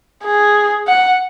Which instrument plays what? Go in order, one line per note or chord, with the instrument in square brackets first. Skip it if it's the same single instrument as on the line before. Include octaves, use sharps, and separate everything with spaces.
[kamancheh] G#4
F#5